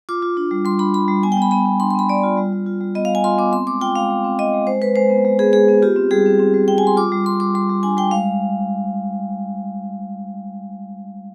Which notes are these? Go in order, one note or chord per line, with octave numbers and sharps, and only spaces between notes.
F4 D6
F4
D4
G3
G3 C6
D4 B5
G3 B5
G3
B3 G#5
G5
B3 B5
B3 B5
B3
D4 C6
C6
B3 B5
B3 D5
F4
G3
G3
F4
G3
B3 D#5
F5
G3
G#5
F4 C6
B3 D6
C4 C6
G#3 D6
F4 G5
G#3 F5
G#3
C4
C4 D#5
G#3
G#3 C5
G#3 B4
G#3 C5
B3
G#3
B3 G#4
G#3 G#4
B3
F4 G4
C4
G3 G#4
C4
C4
G3
C4 G5
G#5
G3 C6
F4 D6
G3
G3 C6
G3 D6
G3 C6
G3
D4 G#5
G3 G5
G#3 F5